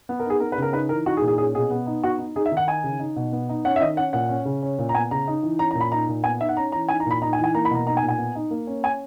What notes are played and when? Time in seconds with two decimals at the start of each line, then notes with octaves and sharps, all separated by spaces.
0.09 B3
0.19 A#4
0.25 D#4 G#4
0.40 B3 A#4
0.52 B4
0.58 C#3 A#4
0.73 D#4 B4
0.89 E3 A#4
1.06 D#4 F#4
1.17 G#4
1.22 A#2
1.28 G#4
1.38 C#4 G#4
1.55 B2 G#4
1.70 B3
1.87 D#4
2.04 B3 F#4
2.19 D#4
2.36 D#4 G#4
2.46 E5
2.51 D#3
2.57 F#5
2.67 D#4 G#5
2.84 C#3
3.00 D#4
3.16 B2
3.33 B3
3.49 D#4
3.65 C#4 F#5
3.76 E5
3.81 D#3 D#5
3.97 C#4 F#5
4.13 A#2 F#5
4.29 C#4
4.45 C#3
4.63 C#4
4.79 A#2
4.89 A#5
4.95 B3 G#5
5.11 C#3 A#5
5.27 D#4
5.43 E3
5.59 C#4 A#5
5.71 A#5
5.75 A#2
5.81 B5
5.92 D#4 A#5
6.08 A#2
6.24 B3 G#5
6.40 D#4 E5
6.49 F#5
6.57 C#4 A#5
6.72 E3 A#5
6.88 D#4 G#5
7.00 A#5
7.06 A#2 B5
7.22 D#4 A#5
7.33 G#5
7.38 E3
7.44 G#5
7.55 A#3 A#5
7.65 B5
7.71 B2 A#5
7.86 D#4 A#5
7.97 G#5
8.03 A#2
8.09 G#5
8.18 B3
8.35 D#4
8.51 A#3
8.67 C#4
8.84 C#4 G#5